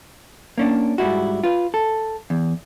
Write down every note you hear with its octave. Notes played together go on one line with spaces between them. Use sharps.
A#3 C#4 D4
G#2 G3 E4 F#4
F4 B4
A4
E2